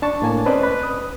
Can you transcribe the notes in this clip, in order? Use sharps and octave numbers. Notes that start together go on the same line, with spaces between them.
D4 A5 C#6
A2 A#3 G#5 A5
C4 C#4 B4 C5 D5 D#5
B4
D#6